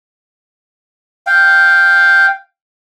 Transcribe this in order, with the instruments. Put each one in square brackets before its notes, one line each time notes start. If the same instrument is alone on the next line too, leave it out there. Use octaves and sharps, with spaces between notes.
[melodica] F5 G5